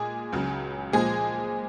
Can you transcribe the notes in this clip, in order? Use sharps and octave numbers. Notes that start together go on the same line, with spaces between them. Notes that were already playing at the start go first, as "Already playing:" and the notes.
Already playing: A#2 G#3 G#4
C#2 C#3 F#3
A#2 F3 G#3 G#4